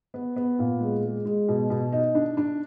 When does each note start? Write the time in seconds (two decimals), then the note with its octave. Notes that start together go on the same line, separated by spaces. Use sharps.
0.14 B3
0.36 B3
0.59 A#2
0.81 G#3
1.04 G#3
1.25 G#3
1.49 B2
1.70 B2
1.92 D#4
2.15 D4
2.37 D4